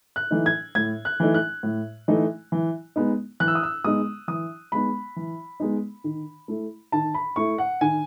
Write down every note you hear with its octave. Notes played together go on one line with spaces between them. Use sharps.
F#6
E3 A3 D#4
G#6
A2 G#6
F#6
E3 A3 D#4
F#6
A2
E3 A3 D#4
E3
G#3 B3 D#4
E3 F#6
E6
D#6
E6
G#3 B3 D#4 D#6
E3 D#6
G#3 B3 D#4 B5
E3
G#3 B3 D#4
D#3
A3 E4
D#3 A5
B5
A3 E4 C#6
F#5
D#3 G#5